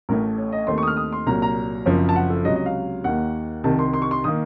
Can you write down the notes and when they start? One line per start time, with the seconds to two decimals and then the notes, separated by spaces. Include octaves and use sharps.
0.09 A1 A2 A3 A#4
0.37 C#5
0.52 D#5
0.67 D#2 D#3 A3 C4 C6
0.78 C#6
0.83 D#6
0.87 F6
0.97 D#6
1.12 C6
1.26 C2 A#2 F#3 A#5
1.42 A#5
1.86 F#1 F#2 F3 C4
2.09 A5
2.16 F#5
2.30 A4
2.45 C#2 C3 F#3 D#5
2.56 D#5
2.66 F5
3.04 D#2 D#3 A#3 F#5
3.64 C2 C3 D#3 A5
3.79 C6
3.93 C6
4.02 C#6
4.11 C6
4.24 D#3 A#3 D#6